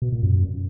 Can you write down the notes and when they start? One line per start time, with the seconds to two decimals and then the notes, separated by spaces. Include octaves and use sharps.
0.02 B2
0.12 A#2
0.23 F#2